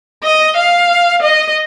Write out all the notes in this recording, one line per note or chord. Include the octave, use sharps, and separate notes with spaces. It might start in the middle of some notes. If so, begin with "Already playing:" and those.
D#5
F5
D#5